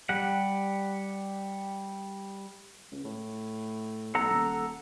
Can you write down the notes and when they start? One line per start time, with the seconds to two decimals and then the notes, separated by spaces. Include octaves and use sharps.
0.09 G3 G4 F#5
2.92 C#2
3.05 A2
4.15 B1 A4 F#5 A#5
4.30 D#1